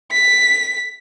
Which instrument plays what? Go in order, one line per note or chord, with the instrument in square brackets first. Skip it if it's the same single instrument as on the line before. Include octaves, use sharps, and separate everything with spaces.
[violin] B6